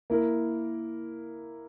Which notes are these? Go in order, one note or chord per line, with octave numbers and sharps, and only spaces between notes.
A#3 E4 A#4